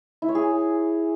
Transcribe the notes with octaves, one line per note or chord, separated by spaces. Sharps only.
E4
C#5
G#4